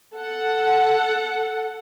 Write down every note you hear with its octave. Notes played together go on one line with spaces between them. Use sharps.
A4 F#5